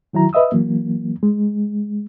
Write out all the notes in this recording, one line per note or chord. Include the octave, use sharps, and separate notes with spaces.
D#3 F#3 E4 A#5
B4 D#5 E5 D#6 E6
E3 F#3 A#3
G#3